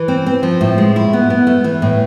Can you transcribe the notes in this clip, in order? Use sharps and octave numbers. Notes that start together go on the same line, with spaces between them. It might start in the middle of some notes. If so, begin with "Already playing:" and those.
Already playing: E3
C4
C4
F3
A2
G#3
E4
B3
B3
A3
E3
A2